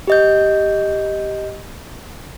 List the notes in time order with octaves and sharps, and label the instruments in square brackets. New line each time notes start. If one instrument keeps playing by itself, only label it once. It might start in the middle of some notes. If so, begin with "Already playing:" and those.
[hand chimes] G4 D#5 G6